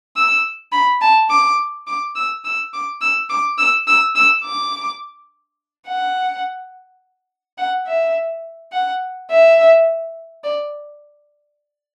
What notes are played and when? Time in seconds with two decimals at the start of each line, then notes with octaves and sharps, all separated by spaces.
0.16 E6
0.72 B5
1.01 A5
1.30 D6
1.87 D6
2.15 E6
2.44 E6
2.73 D6
3.01 E6
3.30 D6
3.58 E6
3.87 E6
4.15 E6
4.44 D6
5.87 F#5
7.58 F#5
7.87 E5
8.72 F#5
9.31 E5
10.44 D5